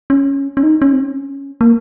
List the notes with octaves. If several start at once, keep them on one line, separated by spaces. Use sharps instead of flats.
C#4
C#4
D#4
C#4
C4
C#4
A#3